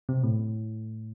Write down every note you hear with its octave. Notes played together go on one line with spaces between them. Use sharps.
C3
A2